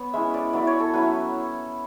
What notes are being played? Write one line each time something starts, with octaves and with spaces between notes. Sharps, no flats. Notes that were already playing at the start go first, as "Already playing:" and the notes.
Already playing: B3 C#5
G#3 C#4 E4 E5
D5
F#3 B3 E4 D5
C#5
A4
F#3 C#4 E4 B4